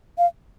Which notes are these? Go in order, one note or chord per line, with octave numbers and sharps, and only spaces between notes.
F5